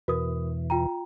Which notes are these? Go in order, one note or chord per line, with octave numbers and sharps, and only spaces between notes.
E2 B2 E3 F#4 A#4 D#6
F4 G5 A#5